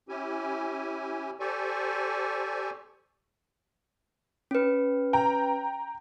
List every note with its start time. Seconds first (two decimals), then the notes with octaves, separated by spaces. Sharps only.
0.09 C#4 E4 G4 G#5
1.40 G4 A4 C5 D5 G#5 C#6
4.51 C#4 B4
5.13 G5 A#5